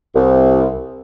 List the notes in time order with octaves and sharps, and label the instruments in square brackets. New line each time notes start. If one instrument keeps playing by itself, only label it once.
[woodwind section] C2